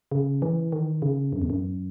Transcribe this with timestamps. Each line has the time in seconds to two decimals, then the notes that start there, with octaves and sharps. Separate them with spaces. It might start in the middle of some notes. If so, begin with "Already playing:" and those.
0.12 C#3
0.42 E3
0.72 D#3
1.02 C#3
1.33 F#2
1.42 E2
1.50 F#2